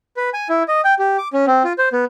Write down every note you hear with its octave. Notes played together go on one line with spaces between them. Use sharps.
B4
G#5
E4
D#5
G5
G4
D6
C#4
C4
F4
C5
B3